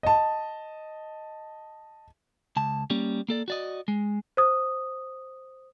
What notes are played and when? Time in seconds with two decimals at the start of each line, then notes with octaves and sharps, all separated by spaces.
0.03 D#5 A5
2.56 C#2 A5
2.90 G3 A#3 C#4
3.29 A#3 A4 D5
3.48 F#4 D5 D#5
3.88 G#3
4.37 C5 D#6